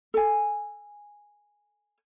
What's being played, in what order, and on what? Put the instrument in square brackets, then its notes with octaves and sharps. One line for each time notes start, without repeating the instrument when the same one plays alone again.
[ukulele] A4 G#5